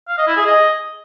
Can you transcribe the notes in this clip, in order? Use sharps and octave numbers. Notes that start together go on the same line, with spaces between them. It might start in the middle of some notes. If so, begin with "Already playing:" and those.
F5
D#5
E4
G#4
D#5